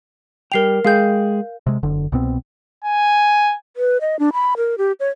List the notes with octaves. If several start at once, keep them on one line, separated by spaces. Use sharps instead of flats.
G3 A#4 G5 C7 F7
G#3 G#4 F5 G5 G6
C3 G#3
F#1 D3
C2 B2 B3 C4
G#5
B4
D#5
D4
B5
A#4
G4
C#5